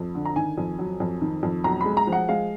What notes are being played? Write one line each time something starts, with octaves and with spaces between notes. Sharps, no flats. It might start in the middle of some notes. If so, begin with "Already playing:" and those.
Already playing: F2
D3
A#5
D#3 G#5
F2
F#3
F2
D#3
F2
B1 A#5
G#3 B5
A#5
F3
F#5
G#3 F5